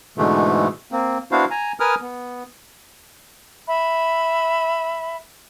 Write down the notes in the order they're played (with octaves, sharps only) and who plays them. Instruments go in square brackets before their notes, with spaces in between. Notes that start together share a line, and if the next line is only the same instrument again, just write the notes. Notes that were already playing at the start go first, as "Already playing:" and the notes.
[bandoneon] G#2 B2 D3 E3 G#3 A3
A#3 C4
B3 D4 E4 F#4 C5 F5
G#5 A#5
A#4 B4 G#5 D#6 F6
B3
[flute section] E5 B5